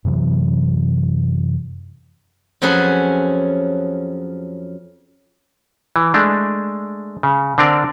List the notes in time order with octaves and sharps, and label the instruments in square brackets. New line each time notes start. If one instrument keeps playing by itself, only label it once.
[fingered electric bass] F#2 C3 E3 F#3
[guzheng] F2 F3 F#3 C#4 G#4 B4
[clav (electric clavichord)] E3
G#3 A3 D4
C#3
D3 C4 D4 A#4 D5